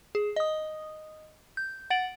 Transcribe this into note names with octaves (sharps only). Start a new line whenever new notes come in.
G#4
D#5 D#6
G6
F#5 A6 D7 F#7